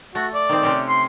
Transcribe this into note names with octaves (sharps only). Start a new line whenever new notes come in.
A3 F#4
D5
D#3 C4
C3 C4 C#4
C6